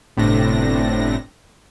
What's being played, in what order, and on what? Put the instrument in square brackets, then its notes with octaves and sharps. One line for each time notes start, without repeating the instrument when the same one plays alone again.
[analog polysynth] G1 A2 C3 A3 D4 A#6